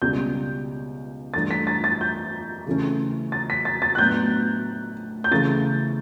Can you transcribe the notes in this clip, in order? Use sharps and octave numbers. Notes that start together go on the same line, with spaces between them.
C#2 B2 G3 C#4 G6
G2 E3 A3 D4 A6
B6
A6
A6
G6
C#3 E3 A3 C#4
A6
B6
A6
A6
F#6
A2 F#3 B3 D4 G6
G6
C#3 E3 A3 C#4 A6